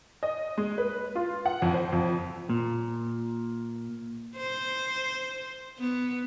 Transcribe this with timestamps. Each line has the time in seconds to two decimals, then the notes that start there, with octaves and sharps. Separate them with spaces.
0.23 D#5
0.57 G#3
0.78 B4
1.15 F4
1.46 F#5
1.62 F2
1.74 C5
1.92 F2
2.50 A#2
4.37 C5
5.79 B3